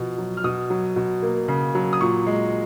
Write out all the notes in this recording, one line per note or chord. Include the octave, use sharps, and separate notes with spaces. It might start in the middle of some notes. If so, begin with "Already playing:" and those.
Already playing: B2 F3
F#3
F6
B2 D#6
F#3
B2
A#3
C#3
F#3
D#6
A#2 C#6
G#3